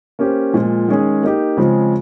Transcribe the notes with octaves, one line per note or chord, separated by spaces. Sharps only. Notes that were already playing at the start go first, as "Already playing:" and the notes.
A#3 C#4 G4 C5
A#2 F3 G#3
D#3 G#3 C#4 G#4
A#3 D#4 G4
C#3 F3 G#3 C4